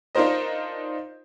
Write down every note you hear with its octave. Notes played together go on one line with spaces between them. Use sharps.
D4 D#4 F4 A#4 C5 D#5